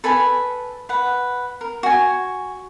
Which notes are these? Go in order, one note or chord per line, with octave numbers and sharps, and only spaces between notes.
A4 B4 G#5 B5
B4 F#5
A#4
F#4 G#5